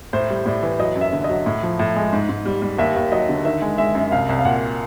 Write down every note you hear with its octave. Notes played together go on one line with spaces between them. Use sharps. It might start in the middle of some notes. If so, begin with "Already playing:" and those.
A2 C5
G3
A2 D5
E3
F#3 D#5
F#2
E5
D3
F#3 D#5
A2
F3
A2
G#3
G#2
G#2
G3
G3
D#2 E5
D#2
F#3 D#5
D3
D#3 E5
G#3
G#3 E5
F#2
C2 F5
C2
F5
A#2 F#5